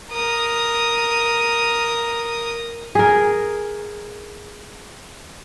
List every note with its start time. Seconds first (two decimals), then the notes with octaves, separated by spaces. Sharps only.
0.11 A#4 D#6
2.95 G#4 A#4